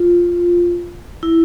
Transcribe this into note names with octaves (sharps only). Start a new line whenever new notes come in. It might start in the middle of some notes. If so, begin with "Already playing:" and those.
Already playing: F4
E4